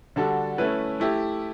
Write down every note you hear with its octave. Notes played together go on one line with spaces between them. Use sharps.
D3 G3 D4 F#4 A4
A3 C#4 E4 B4
A3 E4 G4